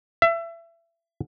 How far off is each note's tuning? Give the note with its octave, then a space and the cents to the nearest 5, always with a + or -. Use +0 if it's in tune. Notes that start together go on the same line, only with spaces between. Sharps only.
E5 +25